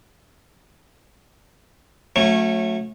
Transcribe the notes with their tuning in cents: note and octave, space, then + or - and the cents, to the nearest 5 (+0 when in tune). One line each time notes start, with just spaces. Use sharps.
F#3 -30 A3 +0 C#4 -20